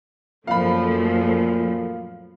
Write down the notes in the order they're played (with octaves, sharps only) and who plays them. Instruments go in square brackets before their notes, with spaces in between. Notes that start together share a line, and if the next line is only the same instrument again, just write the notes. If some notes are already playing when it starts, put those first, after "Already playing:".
[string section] F#2 F3 A3 [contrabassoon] A#2 [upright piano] F5 B5